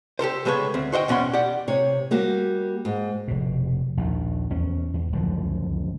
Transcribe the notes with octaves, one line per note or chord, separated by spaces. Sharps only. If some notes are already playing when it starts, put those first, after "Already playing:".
G4 A4 A#4 C5
C#3 G#3 A4 B4 C#5
D2 C4
F#4 C5 D#5 E5 G5
E2 B2 C#4 F#5 C6
G4 D5 F#5
C3 C#5
G3 A#3 F#4 G4
G#2
F1 B2
A#1 D#2
E2 C#4
E2
D1 C#2 F#2 F3